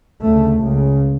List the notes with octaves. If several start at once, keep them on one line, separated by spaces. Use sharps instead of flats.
D2 C#3 A3
C#2 C#3